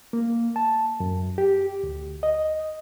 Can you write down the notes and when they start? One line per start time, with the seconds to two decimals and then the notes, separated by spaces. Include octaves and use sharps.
0.13 A#3
0.56 A5
1.00 F#2
1.38 G4
1.84 D2
2.23 D#5